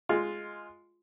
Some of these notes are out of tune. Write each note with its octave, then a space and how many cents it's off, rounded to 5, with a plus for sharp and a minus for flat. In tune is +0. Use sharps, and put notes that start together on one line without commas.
G#3 +0 F4 +0